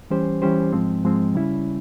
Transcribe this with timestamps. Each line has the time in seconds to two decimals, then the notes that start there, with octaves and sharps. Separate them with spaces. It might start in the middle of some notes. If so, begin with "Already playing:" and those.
0.10 E3 G3 C#4 G4 C5
0.42 E3 G3 C#4 G4 C5
0.73 G#2 F3 G#3 C4
1.04 G#2 F3 G#3 C4
1.35 C#3 G3 C#4 E4